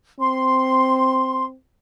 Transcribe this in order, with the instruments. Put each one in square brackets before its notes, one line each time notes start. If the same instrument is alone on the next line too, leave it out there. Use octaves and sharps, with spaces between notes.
[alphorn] C4 [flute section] C6